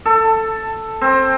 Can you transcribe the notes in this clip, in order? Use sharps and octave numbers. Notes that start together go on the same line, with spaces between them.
A4
C4